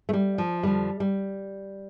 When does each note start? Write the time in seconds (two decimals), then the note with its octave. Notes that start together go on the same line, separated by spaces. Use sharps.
0.09 A3
0.13 G3
0.38 F3
0.63 F2 D3 F3 G3
1.00 G3